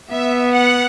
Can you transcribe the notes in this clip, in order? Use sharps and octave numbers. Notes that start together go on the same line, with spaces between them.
B3 E5
F#5